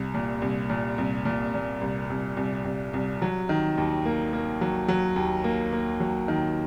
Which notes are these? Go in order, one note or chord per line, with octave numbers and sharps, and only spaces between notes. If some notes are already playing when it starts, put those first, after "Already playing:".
Already playing: C2
A#2
C2
A#2
C2
A#2
A#2
C2
C2
C2
C2
C2
F#3
D#3
D#2
A#3
A#3
F#3
F#3
D#2
A#3
A#3
F#3
D#3